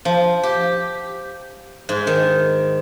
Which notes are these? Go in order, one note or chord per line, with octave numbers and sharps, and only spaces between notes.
F3
G4
G#2
D#3